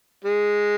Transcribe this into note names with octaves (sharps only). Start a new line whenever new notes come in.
G#3